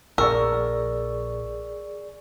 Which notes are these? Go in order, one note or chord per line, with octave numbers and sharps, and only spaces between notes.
A#1 G#4 A#4 D5 C#6 E6